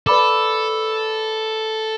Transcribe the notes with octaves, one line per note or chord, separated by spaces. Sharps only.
A4 B4 D5 B5 D6